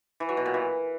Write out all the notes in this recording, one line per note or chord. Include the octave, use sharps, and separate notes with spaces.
E3
F#3
B2
A#2
E3